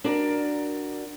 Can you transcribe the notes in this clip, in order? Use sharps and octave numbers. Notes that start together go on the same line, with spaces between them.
D4 F#4 A#4 D5